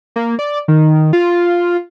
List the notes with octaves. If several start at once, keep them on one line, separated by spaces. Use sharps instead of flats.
A#3
D5
D#3
F4